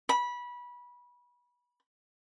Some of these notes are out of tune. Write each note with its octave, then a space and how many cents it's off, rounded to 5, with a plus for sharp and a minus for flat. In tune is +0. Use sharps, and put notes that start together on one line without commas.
B5 -20